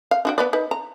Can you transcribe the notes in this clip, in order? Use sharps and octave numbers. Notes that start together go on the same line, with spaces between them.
F5
D4 F#4 G5
B3 B4 D5
D#4 B4
A#5